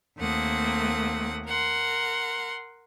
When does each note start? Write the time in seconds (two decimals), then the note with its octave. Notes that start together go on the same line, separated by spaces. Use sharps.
0.18 D#2 A3 A#3 C4 F#5 D#6
1.46 A#4 F#5 C6